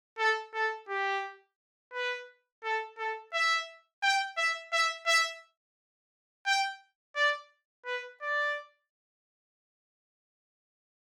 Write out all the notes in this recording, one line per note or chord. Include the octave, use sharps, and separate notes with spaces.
A4
A4
G4
B4
A4
A4
E5
G5
E5
E5
E5
G5
D5
B4
D5